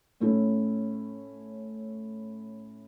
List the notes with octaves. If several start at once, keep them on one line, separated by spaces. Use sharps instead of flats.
A2 A3 C#4 E4